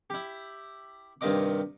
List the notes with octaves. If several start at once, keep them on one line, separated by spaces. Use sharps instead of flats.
E4 G4
G2 C3 D#3 F4 D#5 D6